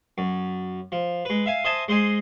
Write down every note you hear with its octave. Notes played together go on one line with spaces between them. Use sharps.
F#2
F3
G#3 B4
E5 F5 G#5
C5 D#5 E5 G#5 A5
G#3 C5 D#5 G#5